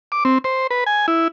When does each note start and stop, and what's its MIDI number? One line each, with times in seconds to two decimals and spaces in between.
0.12 0.24 86
0.25 0.38 60
0.44 0.67 72
0.71 0.84 71
0.86 1.06 80
1.08 1.28 64